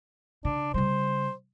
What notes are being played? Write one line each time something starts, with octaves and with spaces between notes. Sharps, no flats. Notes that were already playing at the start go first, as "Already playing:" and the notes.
C#3 D4
C#3 G3 C5